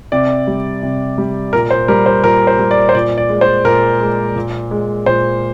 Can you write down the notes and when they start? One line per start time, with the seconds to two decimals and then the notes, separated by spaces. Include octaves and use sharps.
0.12 C3 D5
0.47 G3
0.83 C3
1.18 G3
1.53 A#2 A#4
1.71 C5
1.88 G3 A#4
2.06 C5
2.23 A#2 A#4
2.47 C5
2.59 G3
2.71 D5
2.89 C5
2.95 A#2 D5
3.18 D5
3.29 G#3
3.41 C5
3.65 A#2 A#4
4.00 G#3
4.36 A#2
4.71 G#3
5.06 A#2 C5